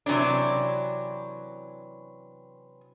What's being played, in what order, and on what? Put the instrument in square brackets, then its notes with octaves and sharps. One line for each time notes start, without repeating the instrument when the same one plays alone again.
[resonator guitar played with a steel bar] C3 E3 F#3 C#4 D4